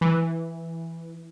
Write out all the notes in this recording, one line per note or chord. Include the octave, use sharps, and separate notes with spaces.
E3